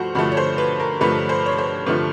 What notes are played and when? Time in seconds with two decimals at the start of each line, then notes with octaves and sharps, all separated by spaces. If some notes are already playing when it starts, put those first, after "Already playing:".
Already playing: G2 F3 A3 F#4 C5
0.15 G2 D3 F3 A3 F#4
0.32 C#5
0.37 C5
0.58 B4
0.80 A#4
1.01 G2 D3 F3 A3 B4
1.29 C5
1.46 C#5
1.58 C5
1.86 G2 D3 F3 A3 B4